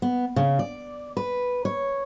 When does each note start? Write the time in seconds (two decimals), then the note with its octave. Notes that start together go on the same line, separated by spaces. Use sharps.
0.02 B3
0.36 C#3
0.59 D5
1.17 B4
1.65 C#5